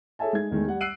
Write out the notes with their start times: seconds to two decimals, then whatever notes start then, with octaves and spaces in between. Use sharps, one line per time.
0.19 G#4 A4 C#5 E5 G#5 A5
0.33 G#3 D#4 G#6
0.51 E2 D#3 G#3 A3
0.67 G3 F#5
0.81 E6 F#6 C7 D7 D#7 F#7